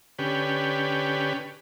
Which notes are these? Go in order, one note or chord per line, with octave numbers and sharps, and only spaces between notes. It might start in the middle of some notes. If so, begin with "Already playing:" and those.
D3 C#4 G4 B4